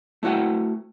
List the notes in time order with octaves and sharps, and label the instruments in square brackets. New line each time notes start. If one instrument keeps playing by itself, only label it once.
[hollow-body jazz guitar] A3 E4 F#4 F#5 G5